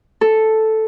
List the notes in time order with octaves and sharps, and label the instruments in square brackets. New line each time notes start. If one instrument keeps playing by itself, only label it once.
[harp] A4